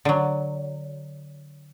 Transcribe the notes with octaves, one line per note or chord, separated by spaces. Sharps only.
D3 F#3